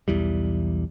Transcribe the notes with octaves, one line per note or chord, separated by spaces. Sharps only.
B1 E2 E3 G3